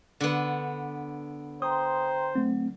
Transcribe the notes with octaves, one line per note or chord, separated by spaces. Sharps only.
D3 B3
C5 G5 A#5 C6 D#6
F#3 A3 C4